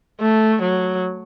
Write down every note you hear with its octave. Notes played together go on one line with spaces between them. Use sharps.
A3
F#3